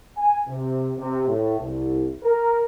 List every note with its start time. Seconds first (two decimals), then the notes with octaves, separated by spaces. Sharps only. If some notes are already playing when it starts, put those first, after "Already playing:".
0.17 G#5
0.47 C3
0.97 C3
1.27 A2
1.58 C2
2.23 A#4